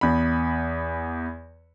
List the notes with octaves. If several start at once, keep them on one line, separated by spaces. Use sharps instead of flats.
E2 B5